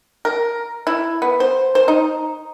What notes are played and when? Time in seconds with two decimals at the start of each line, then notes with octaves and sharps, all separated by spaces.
0.25 A#4
0.87 E4
1.22 B3
1.40 C5
1.75 C5
1.88 D#4